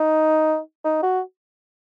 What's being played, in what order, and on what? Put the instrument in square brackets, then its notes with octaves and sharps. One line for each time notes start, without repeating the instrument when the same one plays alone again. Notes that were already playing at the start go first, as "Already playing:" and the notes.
Already playing: [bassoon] D#4
D#4
F#4